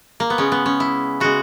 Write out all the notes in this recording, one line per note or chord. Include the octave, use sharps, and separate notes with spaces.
A#3
B3
C#3 G#3 C#4
B3
C#4
E4
C#3 G#3 F#4